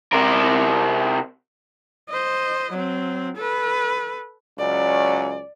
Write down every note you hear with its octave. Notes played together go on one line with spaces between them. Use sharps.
C3 A#4
C5 D#5
F#3 C4
A4 B4
C#2 F#3 C#4 D5